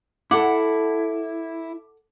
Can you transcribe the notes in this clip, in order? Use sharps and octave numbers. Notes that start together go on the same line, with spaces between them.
E4 A4 F#5 D6